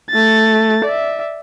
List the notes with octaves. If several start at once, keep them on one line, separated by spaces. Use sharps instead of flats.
A3 A6
D5 E5